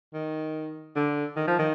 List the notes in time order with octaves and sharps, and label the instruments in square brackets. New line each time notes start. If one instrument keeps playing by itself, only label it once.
[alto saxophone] D#3
D3
D#3
F3
D#3